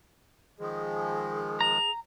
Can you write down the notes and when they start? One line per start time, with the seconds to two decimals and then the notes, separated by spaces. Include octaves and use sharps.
0.59 D#3 F3 G#3 G#4
1.61 A#5 F7